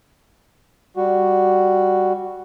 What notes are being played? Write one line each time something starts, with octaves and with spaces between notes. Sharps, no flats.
G3 F#4